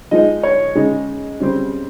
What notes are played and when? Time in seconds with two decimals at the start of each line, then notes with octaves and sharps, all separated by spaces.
0.11 F3 G#3 D#4 D#5
0.43 C#5
0.75 C#3 G#3 D#4
1.40 C#3 G3 C4